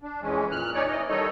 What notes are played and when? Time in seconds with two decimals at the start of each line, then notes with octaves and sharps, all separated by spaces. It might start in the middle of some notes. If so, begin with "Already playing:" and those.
0.02 D4
0.22 F2 E3 G#3 C#4
0.51 A#2 F6 F#6
0.74 C#4 D#4 C#5 D5
0.88 E3 D#5
1.09 D#3 G3 D#4 A4 C#5 D#5